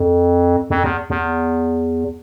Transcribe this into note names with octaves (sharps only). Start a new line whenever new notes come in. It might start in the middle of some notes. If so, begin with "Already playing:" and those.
Already playing: F2
F2
E2
E2